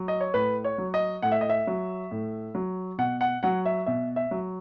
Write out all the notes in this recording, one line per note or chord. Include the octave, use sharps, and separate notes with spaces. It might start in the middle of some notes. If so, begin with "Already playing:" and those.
Already playing: F#3
D#5
C#5
A2 B4
C#5
F#3
D#5
A2 F#5
E5
D#5
E5
F#3
A2
F#3
B2 F#5
F#5
F#3 F#5
E5
B2 E5
E5
F#3